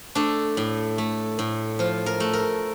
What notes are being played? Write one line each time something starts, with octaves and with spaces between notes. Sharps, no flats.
A3 D4
A2
A3
A2
F3 F4
A#4
A3
A#4